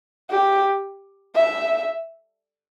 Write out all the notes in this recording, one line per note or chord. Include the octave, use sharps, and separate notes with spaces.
G4
E5